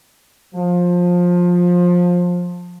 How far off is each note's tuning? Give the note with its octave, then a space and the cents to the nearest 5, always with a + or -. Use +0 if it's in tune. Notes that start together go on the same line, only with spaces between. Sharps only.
F3 +20